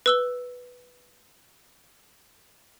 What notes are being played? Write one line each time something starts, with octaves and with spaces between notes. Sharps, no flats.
B4 E6 G7